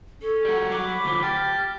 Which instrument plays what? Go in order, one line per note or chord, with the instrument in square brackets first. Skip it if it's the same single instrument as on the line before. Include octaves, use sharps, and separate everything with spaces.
[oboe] C#4 [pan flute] A4
[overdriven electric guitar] G3 F#4
[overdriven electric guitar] F#3 F#4 [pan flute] D6
[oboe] B5
[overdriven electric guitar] D2 F3
[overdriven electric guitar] G4 [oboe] A5 [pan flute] F6